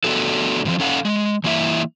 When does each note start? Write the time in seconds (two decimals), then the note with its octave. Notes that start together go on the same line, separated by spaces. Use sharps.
0.04 A3 B3 D4 F#4 A4
0.65 A2 E3 F3 C4
0.80 C#4 A4 F5 F#5
1.05 G#3
1.44 E3 A#3 E4 E5